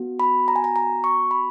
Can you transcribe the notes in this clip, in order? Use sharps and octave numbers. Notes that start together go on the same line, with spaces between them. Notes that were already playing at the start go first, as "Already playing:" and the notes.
Already playing: B3 F#4
B5
A#5
G#5
A#5
A#5
C#6
B5